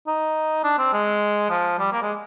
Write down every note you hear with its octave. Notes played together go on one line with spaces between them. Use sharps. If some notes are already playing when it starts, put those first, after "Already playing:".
D#4
D4
C4
G#3
F3
G3
A#3
G#3